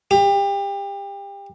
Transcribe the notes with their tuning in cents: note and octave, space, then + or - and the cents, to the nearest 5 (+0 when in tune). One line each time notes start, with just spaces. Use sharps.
G4 +30